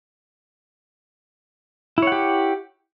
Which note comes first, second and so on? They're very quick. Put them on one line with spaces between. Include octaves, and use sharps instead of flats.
E4 C#5 F#5 G4